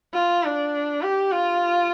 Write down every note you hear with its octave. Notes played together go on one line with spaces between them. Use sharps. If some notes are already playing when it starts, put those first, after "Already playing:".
F4
D4
G4
F4